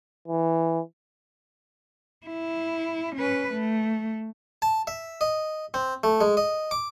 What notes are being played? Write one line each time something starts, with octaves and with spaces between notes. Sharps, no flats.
E3
E4
C#4 B4
A3
A5
E5
D#5
C4
A3
G#3
D#5
D6